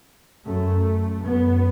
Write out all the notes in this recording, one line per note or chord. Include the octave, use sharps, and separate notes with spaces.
F#2 A3
F#2 B3